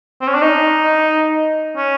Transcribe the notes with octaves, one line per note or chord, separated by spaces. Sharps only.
C4
C#4
D4
D#4
C#4